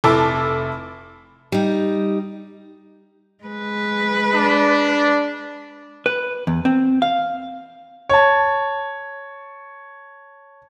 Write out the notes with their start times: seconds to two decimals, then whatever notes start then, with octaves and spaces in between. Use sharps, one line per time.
0.04 F1 E4 A4 A5 D6
1.52 G3 D#4
3.44 G#3 B4
4.34 D4
6.06 B4
6.47 E2
6.65 C4
7.02 F5
8.09 C#5 A5